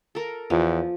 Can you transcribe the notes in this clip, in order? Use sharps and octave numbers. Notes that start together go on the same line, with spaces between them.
A4 A#4
E2 F3